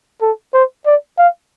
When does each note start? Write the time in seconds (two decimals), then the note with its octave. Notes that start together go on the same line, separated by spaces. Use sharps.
0.22 A4
0.54 C5
0.86 D5
1.18 F5